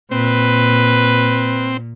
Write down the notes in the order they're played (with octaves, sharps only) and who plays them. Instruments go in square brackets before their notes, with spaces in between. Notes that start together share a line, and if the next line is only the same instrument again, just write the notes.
[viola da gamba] A#2 [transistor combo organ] C4 [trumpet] B4